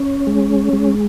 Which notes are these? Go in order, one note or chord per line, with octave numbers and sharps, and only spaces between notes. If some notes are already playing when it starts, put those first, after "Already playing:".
Already playing: C#4
G#3
G#3